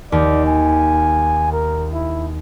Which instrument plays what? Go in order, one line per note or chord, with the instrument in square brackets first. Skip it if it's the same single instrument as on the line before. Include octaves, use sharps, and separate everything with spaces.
[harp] D#2 [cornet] D5
[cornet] G#5
A#4
E4